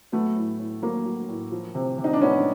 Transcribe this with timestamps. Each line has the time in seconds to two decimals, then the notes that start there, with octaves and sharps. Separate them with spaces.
0.12 F#3 A3 B3
0.36 A2
0.60 A2
0.82 F#3 A#3
1.05 F#3
1.29 A2
1.52 F3
1.75 C3
1.98 C3
2.04 D#4
2.13 D4
2.21 F3 B3 C#4